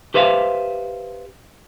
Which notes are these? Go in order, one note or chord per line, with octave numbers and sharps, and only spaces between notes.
G4 B4 C5 E5 F5